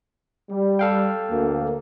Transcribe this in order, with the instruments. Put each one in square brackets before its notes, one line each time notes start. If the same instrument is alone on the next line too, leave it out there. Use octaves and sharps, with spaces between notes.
[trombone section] G3
[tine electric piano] A4 F5 G5
[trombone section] D2 A#3